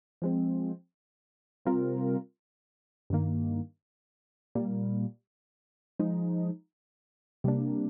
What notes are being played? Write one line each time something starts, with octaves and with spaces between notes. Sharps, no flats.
F3 G#3 C4
C3 G3 C4 F4 A#4
G2 D#3 A#3
A#2 G3 A#3
F3 G#3 D#4
C3 G3 A#3 D4